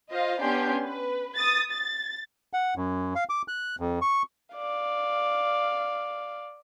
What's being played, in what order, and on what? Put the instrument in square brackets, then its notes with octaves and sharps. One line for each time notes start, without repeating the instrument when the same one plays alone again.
[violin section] F4 C5 D#5 F5
B3 C#4 D4 G4 C6 G6
B4
D#6 A6
A6
[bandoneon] F#5
F#2
F5
D6
F#6
F2
C#6
[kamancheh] D5 F5